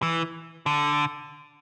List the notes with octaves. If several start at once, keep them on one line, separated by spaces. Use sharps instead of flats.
E3
D3